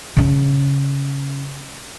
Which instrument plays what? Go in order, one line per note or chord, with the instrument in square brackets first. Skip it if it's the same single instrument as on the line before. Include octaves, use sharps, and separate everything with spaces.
[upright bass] C#3 C#4